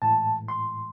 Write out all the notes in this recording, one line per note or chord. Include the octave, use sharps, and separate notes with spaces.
A2 E3 G#3 A5
C6